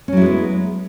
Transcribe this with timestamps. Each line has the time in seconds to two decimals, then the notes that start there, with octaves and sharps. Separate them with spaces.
0.08 C#4
0.12 F#3
0.17 E4
0.21 G#3
0.26 B3